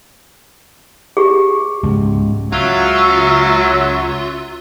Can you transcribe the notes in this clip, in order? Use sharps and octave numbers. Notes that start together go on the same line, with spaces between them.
G4 G#4
C#2 G#2
C#2 F#3 F4 E5